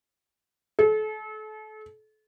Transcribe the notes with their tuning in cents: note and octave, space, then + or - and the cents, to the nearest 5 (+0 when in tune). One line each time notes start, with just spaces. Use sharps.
A4 -35